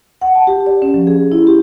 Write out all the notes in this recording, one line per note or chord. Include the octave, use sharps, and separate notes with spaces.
F#5
A5
G4
D5
C#4
F3
G#4
E4
G4